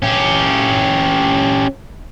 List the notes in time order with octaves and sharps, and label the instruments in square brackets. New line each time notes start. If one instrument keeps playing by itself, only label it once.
[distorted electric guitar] C#4 G4